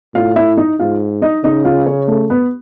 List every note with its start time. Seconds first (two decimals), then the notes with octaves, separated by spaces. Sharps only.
0.15 A2 F4 F5
0.36 E4 E5
0.57 D#4 D#5
0.79 G#2 F4 F5
1.22 D#4 D#5
1.44 C#3 D#4 D#5
1.65 F4 F5
1.86 C#4 C#5
2.08 A3 A4
2.30 B3 B4